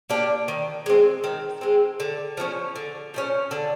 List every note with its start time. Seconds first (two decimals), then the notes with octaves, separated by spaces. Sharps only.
0.10 A#3 D4 G4
0.48 D#3
0.86 G#3 C4
1.24 D#3
1.61 G#3 C4
2.00 D3
2.37 F3 A3 C#4
2.76 D3
3.14 F3 A3 C#4
3.51 D3